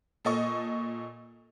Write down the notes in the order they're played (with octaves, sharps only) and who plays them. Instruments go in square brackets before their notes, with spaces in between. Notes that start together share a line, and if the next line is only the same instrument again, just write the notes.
[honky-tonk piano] A#2 A4 D#5 C#6